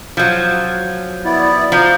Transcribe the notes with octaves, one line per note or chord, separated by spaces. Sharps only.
F3 F#3
B3 E4 D5
F3 A#5 D6